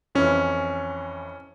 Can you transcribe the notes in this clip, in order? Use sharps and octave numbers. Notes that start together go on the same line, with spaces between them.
F2 E3 C#4